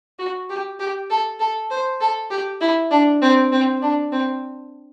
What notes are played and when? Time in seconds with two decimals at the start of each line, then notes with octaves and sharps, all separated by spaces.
0.19 F#4
0.50 G4
0.79 G4
1.10 A4
1.40 A4
1.70 C5
2.00 A4
2.31 G4
2.61 E4
2.91 D4
3.22 C4
3.52 C4
3.82 D4
4.12 C4